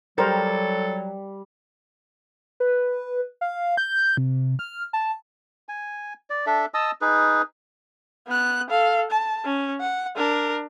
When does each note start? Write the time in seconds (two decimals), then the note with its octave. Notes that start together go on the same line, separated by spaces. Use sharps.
0.18 F#3 G3 A4 A#4 C5
2.60 B4
3.41 F5
3.77 G6
4.17 C3
4.59 F6
4.93 A5
5.69 G#5
6.30 D5
6.46 D4 A4 E5
6.74 D#5 A5 D#6 E6
7.01 D#4 G#4 B4
8.28 B3 F#6
8.70 A4 F5
9.11 A5
9.44 C#4
9.80 F#5
10.16 D4 A#4